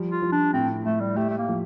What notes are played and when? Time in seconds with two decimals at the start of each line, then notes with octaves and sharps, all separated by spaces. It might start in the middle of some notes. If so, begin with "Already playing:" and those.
Already playing: F3 G3
0.11 F4
0.22 F3
0.32 D4
0.53 A2 C4
0.85 A2 A3
1.00 G3
1.16 A3 G4
1.29 A3
1.38 A#3
1.48 F3